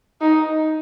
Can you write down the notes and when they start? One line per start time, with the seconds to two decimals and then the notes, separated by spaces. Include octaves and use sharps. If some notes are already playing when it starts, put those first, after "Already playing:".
0.21 D#4